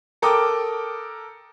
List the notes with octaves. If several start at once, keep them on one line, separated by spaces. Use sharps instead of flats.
A4 A#4 G5 D6 D#6